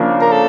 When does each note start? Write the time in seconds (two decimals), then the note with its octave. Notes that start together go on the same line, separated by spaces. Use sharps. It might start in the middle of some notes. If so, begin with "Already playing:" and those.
Already playing: C#3 F3 A#3 D4
0.21 A#4
0.32 A4